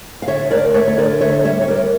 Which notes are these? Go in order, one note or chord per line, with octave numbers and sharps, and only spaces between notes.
F5
D3 C#5 E5
D2 A#4 D5
A3 C#5 E5
C#5
D3 A#4 D5
D2 C#5 E5
G3 C#5 E5
C#5
G3 A#4 D5